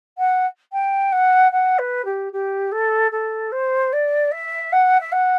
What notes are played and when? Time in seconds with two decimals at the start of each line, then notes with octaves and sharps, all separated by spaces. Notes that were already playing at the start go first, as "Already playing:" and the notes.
0.18 F#5
0.72 G5
1.12 F#5
1.52 F#5
1.78 B4
2.05 G4
2.32 G4
2.72 A4
3.11 A4
3.52 C5
3.93 D5
4.31 E5
4.72 F#5
5.00 E5
5.12 F#5